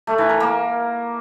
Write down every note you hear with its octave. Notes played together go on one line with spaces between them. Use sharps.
A3
E3
A#4
A#3